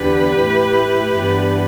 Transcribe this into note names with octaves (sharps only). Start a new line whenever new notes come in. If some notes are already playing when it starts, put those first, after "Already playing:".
Already playing: E2 D3 B3 D4 G4 B4
A2 A3 E4
G2 E3 B3 D4